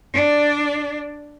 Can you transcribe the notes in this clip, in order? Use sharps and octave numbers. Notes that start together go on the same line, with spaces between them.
D4 D5